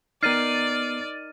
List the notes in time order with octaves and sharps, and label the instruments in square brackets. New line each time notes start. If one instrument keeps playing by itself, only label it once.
[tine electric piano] B3 C7 [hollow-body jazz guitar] D#4 A#4 [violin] D5 [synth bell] F6 A6 D#7